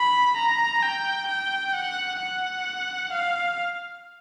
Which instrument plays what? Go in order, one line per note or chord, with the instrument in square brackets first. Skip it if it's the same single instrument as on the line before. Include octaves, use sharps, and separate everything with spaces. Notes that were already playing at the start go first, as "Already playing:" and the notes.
Already playing: [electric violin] B5
A#5
G5
G5
F#5
F#5
F5